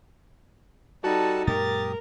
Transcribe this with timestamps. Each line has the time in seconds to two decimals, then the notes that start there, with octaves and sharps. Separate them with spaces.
1.04 G3 D#4 F#4 A4 A5
1.47 F#2 A#2 G#3 G4 A#4 D#6 A6